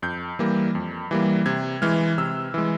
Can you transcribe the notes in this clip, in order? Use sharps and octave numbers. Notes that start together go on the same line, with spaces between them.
F2 G6
E3 G3 A#3
F2
E3 G3 A#3
C3 G#6
E3 G#3 F6
C3 E6
E3 G#3